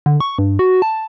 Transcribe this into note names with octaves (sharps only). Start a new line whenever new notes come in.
D3
C#6
G2
F#4
A5